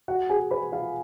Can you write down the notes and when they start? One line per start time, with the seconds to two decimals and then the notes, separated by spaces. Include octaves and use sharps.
0.08 F#4 F#5
0.29 G#4 G#5
0.51 B4 B5
0.72 F4 F5